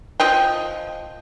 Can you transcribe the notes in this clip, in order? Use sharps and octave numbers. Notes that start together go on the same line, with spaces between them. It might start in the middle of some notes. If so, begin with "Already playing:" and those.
F3 D#5 G5